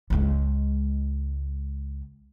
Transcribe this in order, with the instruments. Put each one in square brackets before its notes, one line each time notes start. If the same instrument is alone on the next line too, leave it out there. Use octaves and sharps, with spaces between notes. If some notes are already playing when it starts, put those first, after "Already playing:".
[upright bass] C#2 G#3